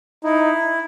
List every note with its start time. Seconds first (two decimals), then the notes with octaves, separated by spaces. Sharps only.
0.24 D#4 E4